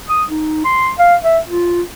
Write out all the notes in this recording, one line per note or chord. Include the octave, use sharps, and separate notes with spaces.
D#6
D#4
C6
F5
E5
F4